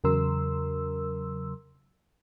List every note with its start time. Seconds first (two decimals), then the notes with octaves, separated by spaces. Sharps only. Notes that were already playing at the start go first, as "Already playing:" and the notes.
0.04 E2 C#3 F#3 A#4 C6 E6